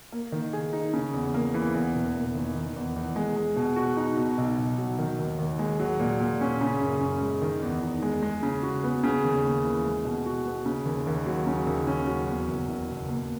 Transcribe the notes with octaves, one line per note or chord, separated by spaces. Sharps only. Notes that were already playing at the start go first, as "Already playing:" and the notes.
A#3
D#3
G#4
D#4
C#3
E2
A#3
E3
E2
E1
A#3
D#3
D#3
E2
E2
G#3
G#3
B2
F#4
D#4
B2
B1
B1
F#3
D#3
D#2
D#2
G#3
F#3
A#2
A#2
C#4
C#3
F#2
C#4
G#3
D#3
E2
D#4
G#3
G#3
C#3
F#4
B3
C#3
D#2
A#3
E3
G#3
B2
F#4
B3
C#3
D#2
D#2
F#3
C#3
D#2
C#4
F#3
E2
F#1
F#1
B2
A#3